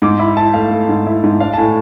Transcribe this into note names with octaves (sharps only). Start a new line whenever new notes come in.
G#2 D6
E4 B5
E4 A5
A3 F5
A3
G#2
E4
G#2
D4 F5
A5
A2 G#5